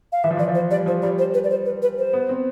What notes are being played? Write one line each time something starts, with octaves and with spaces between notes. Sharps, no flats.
F5
E3 E5
F3
E3 D5
F3
C5
G3 D5
F3 C5
G3 D5
C5
B4
D5
C5
B4
B4
C5
B3
C4